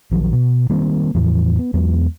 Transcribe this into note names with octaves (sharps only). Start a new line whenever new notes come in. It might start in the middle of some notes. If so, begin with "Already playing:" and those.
A#1 D#3 F3 F#3
B2
D#3 G3 A#3 C4
E2 A2 E3 F3
B3
E2 F#3 G#3 B3